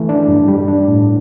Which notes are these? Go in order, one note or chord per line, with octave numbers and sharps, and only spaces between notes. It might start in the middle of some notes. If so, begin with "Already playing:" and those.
Already playing: E3 A3
D4
G2
G3
D4
A2